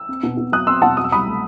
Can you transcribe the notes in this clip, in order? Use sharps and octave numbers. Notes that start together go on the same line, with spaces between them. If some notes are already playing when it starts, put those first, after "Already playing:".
Already playing: E6
C4
B2
B2
F#3 D#6 F#6
C4 C6 E6
B2 F#5 A5
F#3 D#6
E6
C2 B5 D#6
A3